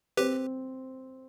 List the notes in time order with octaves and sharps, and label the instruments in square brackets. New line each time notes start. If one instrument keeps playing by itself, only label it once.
[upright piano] C4 [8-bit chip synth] G4 B4